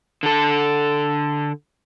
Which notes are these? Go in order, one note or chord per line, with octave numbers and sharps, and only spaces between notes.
D3 A4